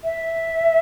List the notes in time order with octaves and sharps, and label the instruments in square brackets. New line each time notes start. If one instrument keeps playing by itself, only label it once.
[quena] E5